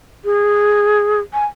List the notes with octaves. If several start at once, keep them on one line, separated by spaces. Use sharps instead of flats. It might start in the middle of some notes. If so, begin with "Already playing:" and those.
G#4
G#5